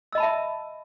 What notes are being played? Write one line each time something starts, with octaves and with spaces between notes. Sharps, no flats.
D#5 E5 A5 B5 E6